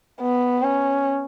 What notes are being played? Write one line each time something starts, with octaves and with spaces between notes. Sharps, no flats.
B3
C#4